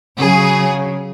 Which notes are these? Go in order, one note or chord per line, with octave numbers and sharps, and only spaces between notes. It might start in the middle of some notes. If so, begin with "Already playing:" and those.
C#3 F#3 G#4